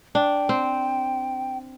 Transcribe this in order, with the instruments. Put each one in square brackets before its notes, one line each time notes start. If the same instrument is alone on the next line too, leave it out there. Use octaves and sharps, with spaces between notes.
[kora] D4 [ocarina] G5
[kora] C4